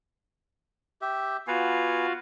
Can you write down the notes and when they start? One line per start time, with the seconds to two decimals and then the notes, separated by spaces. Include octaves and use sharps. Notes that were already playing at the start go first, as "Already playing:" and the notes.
1.01 G4 E5
1.47 B3 F4 F#4 F5 G#5